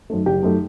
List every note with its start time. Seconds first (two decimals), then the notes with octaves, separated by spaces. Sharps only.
0.10 F#2 D#3 A3
0.26 F#1 G4
0.43 F#2 D#3 A3